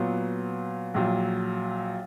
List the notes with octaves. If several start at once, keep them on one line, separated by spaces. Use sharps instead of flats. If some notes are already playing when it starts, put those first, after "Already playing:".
Already playing: A#2 F#3 B3
A#1 A#2 F#3